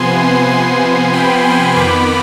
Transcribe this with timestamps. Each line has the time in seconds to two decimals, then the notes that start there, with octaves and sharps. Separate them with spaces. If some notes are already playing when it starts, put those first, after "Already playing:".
Already playing: C3 F3 B3 G#5 C6
0.50 G#5 C6
1.13 G5 B5
1.45 G#5 C6
1.76 F2 D#3 B3 B5 D6